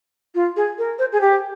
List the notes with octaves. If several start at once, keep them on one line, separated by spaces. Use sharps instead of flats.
F4
G#4
A#4
C5
G#4
G4